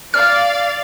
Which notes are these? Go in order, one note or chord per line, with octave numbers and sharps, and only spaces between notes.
D5 F5 F6 A6